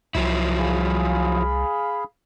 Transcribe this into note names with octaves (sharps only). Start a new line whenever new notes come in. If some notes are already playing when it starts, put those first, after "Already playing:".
C2 F3 F#3 E4
G#4 F5 B5